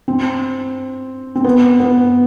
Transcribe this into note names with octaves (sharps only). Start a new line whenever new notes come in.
C4
C4
B3
B3